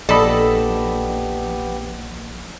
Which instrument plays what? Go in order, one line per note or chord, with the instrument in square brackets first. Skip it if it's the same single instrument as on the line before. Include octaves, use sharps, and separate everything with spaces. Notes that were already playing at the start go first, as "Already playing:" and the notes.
[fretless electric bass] A#1 [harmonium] B3 G4 [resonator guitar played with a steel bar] A4 [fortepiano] D5 D#5 B5